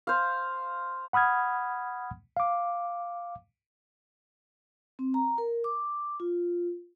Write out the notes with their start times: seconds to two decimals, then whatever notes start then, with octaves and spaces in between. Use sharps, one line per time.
0.07 C5 F5
1.13 F#5 B5 D#6 F6 G#6
2.37 F5 D6
4.99 C4
5.14 A#5
5.38 A#4
5.64 D6
6.20 F4